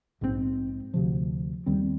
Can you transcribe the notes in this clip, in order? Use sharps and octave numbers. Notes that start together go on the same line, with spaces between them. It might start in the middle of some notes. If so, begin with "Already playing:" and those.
A#1 G#2 F3 C4
D2 C3 F3
D#2 D#3 G3 C4